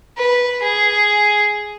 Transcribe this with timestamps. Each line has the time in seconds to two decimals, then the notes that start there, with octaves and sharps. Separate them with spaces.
0.17 B4
0.62 G#4